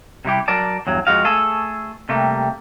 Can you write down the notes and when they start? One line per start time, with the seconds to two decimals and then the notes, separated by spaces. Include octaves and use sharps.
0.25 C3 G3 E4 G4
0.48 F#3 A#4 D5 A5
0.87 E2 G2 F#3
1.07 F2 G#3 F#4 F5
1.24 A3 G#4 A4
2.09 C3 G3 A3 A#3